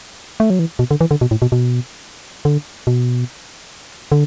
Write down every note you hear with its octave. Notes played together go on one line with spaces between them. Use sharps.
A3
F#3
E3
B2
D3
E3
D3
B2
A2
B2
B2
D3
B2
D3